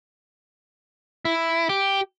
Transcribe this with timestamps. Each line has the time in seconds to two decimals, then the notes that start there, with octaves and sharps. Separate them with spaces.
1.25 E4
1.69 G4